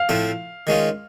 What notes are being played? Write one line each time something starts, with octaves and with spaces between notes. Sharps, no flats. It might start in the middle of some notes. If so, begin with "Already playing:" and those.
Already playing: F5
A2 F3 A3 C4
D#3 G#3 C#4 F4